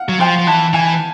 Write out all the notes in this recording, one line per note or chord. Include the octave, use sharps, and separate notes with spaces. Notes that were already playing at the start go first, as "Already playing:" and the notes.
Already playing: F5 F#5
F#3
F3 G5
F3
E3 A5
E3 G#5